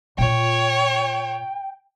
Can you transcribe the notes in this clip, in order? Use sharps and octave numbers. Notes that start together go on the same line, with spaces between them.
A#2 F4 C#5 G5